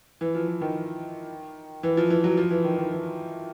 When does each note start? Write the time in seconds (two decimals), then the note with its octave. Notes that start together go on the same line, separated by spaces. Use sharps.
0.21 E3
0.35 F3
0.48 E3
0.61 D#3
1.83 E3
1.97 F3
2.10 E3
2.24 F#3
2.37 F3
2.51 E3
2.64 D#3
2.78 D#3
2.92 E3